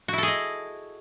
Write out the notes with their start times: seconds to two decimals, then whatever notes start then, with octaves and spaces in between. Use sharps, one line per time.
0.08 F#4
0.13 E4
0.18 A4
0.23 G#4
0.28 D#5